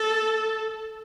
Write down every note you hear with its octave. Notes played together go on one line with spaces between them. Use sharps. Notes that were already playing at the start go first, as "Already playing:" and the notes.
Already playing: A4